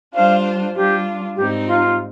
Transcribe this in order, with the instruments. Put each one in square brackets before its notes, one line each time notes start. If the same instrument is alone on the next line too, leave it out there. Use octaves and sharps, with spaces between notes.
[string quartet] G3 D4 F4 C5 [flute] F5
[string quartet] G3 D4 F4 [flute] G4
[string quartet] G#2 G3 C4 D#4 [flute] G4
[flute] F4